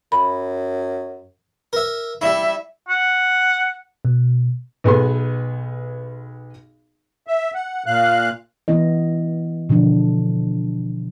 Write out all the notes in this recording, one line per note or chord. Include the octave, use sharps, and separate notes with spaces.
F#2 B5
A#4 E5
G3 E4 E5
F#5
B2
B1 B3 G#4 C6
E5
F#5
A#2 F5 F#6
E3 B3 E4 D#5
B2 D3 F3 D4